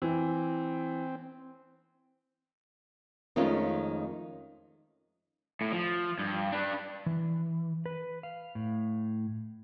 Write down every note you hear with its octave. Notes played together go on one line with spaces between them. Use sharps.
E3 C4
F2 D#3 G#3 A3 C#4 F4
A2
F3
G2
D4 B4
E3
B4
F5
A2